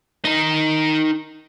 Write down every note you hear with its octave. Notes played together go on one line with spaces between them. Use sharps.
D#4 A#4